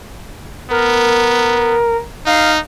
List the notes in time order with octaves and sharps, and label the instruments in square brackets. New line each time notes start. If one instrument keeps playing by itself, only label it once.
[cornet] B3 [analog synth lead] A#4
[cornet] D#4 [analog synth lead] F5